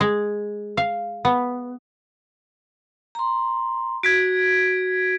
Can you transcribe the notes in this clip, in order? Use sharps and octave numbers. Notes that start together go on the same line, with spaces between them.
G#3
F5
B3
A#5 C6
F#4 G#6 B6 D7